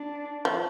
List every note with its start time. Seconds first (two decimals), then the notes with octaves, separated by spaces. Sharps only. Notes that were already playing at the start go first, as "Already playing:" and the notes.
Already playing: D4
0.45 F3